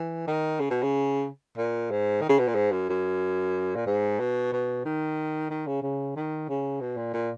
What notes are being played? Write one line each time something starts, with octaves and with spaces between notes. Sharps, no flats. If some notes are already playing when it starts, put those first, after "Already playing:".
Already playing: E3
D#3
C#3
B2
C#3
A#2
G#2
D#3
C#3
B2
A#2
G#2
F#2
F#2
A#2
G#2
B2
B2
D#3
D#3
C#3
C#3
D#3
C#3
B2
A#2
A#2